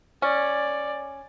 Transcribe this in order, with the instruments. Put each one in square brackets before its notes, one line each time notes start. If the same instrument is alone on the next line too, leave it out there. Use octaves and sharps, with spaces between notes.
[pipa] C#4 [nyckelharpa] D5